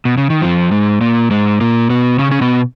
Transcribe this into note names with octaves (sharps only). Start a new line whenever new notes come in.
B2
C#3
D#3
F2 F3
G#2 G#3
A#2 A#3
G#2 G#3
A#2 A#3
B2 B3
C#3 C#4
C#4
B2 B3